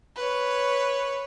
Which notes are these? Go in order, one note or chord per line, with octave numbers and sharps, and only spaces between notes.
B4 C#5